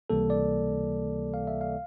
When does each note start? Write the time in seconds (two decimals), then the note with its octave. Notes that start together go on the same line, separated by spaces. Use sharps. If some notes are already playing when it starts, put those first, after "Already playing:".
0.10 C#2 C3 E3 G3 A#3 A4
0.30 D5
1.34 F5
1.47 E5
1.61 F5